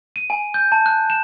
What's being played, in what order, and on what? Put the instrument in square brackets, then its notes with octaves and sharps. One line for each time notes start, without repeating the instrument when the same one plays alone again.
[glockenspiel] D#7
G#5
G6
A5
F#6
E7